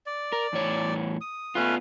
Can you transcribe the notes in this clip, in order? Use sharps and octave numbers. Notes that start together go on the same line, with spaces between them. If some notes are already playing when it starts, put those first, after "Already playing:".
D5
A#4
E2 A2 C#5
D#6
A3 B3 C#4 F4 B4